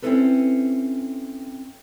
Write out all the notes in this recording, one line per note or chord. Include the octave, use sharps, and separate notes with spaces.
C4 C#4 E4 G#4 A4 B4